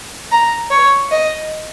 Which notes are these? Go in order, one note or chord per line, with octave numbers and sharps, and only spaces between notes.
A#5
C#5
D#5